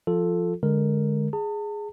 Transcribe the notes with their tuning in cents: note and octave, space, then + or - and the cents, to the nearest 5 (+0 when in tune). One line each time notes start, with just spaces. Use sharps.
F3 +0 F4 +10 A4 +0
D3 +0 G#3 +0 A#4 +0
G#4 +0 A5 +40